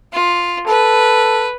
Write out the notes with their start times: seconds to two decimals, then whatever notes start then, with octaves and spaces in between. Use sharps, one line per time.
0.12 F4
0.67 A4 B4